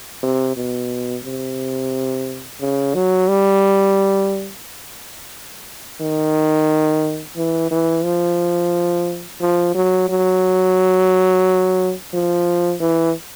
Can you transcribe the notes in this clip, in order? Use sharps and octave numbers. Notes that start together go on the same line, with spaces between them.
C3
B2
C3
C#3
F#3
G3
D#3
E3
E3
F3
F3
F#3
F#3
F3
E3